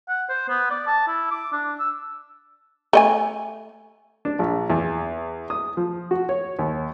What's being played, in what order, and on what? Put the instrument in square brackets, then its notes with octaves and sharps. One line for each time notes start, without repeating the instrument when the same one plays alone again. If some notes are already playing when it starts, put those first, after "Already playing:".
[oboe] F#5
C5
B3
D5
A5
E4
D6
D4
E6
[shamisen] A3 D#5 G#5
[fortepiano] D4
A#1
E2
D#6
F3
F#4
C#5
D#2